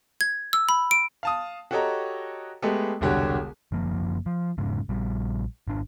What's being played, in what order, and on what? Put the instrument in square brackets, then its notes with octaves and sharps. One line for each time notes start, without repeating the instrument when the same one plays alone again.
[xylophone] G#6
E6
B5
D7
[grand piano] F5 A5 D#6
F#4 G4 A4 C#5 D#5 A#5
G#3 A3 B3 G4 A4
E1 C2 D3 F#4 G4 C#5
[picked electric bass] F#1 F#2 F3 A#3
F3
E1 G#2 C#3
A#1 G3
G#1 D4